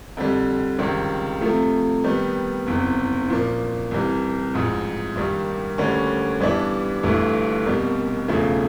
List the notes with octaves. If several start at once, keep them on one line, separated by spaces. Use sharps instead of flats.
F2 D3 G3
C#2 C3 D#3 G3 C4
C3 F3 A3
D#3 G3 B3
F#1 E2 C3
A#2 F3 A#3
C2 C3 E3 G3
A1 G#2 F3
G2 D#3 G3 A#3
D2 D3 G3 A#3 C#4
G2 E3 G3 B3 D4
G1 G2 E3 A3
C2 B2 G3 A#3
E1 E2 C#3 F3 A3